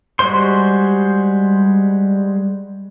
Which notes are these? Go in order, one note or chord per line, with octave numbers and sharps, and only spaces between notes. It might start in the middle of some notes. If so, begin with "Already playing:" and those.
G3 G#3 F#4 C5 C6